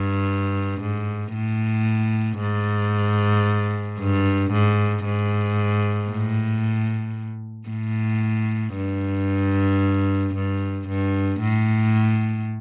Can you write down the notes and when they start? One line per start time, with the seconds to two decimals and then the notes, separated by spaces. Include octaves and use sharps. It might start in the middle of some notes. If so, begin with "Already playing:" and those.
Already playing: G2
0.81 G#2
1.34 A2
2.40 G#2
3.99 G2
4.52 G#2
5.05 G#2
6.11 A2
7.70 A2
8.76 G2
10.35 G2
10.88 G2
11.41 A2